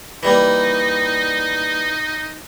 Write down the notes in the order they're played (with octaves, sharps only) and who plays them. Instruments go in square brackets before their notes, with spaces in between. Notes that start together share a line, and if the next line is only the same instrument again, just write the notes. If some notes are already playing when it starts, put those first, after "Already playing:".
[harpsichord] E3 G3 A#3 [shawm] D#4